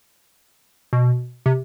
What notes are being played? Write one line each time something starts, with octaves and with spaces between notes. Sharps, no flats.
B2
C3